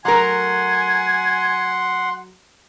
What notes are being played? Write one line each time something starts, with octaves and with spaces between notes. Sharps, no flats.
F#3 A3 A#4 F#5 G#5 C6